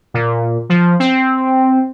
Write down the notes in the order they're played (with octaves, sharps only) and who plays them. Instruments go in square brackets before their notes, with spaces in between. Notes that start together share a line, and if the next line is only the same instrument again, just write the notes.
[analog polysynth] A#2
F3
C4